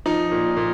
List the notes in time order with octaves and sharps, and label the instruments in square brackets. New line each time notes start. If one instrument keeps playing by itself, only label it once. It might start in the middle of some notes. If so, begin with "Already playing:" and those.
[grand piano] F3 D#4
A#2
A#2